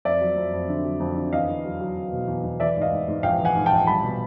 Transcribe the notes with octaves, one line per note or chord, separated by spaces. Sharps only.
F2 D5 E5
F#3
F2
F2
D3
F#3
F2
D3
E2 D#5 F5
E2
F#3
F#3
F#3
B2
E2
E2
E3 D5 E5
G#2 D#5 F5
G#2
G#2
A#1 F5 G5
E3
F#5 G#5
G#2
G5 A5
A#1
G3 A5 B5
B2